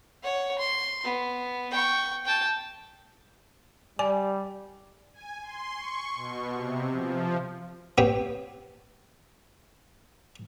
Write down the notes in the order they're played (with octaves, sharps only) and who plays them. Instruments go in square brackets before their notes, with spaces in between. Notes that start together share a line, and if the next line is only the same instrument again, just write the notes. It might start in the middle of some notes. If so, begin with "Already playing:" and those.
[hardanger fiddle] C#5 F#5
C6
B3
G5 C#6
G5 A5
[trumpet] G3 [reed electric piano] D5 [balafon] G#5
[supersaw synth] G#5
C6
C#6
B2
C3
F3
[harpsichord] B3 C4 G4 C5 C#5 G5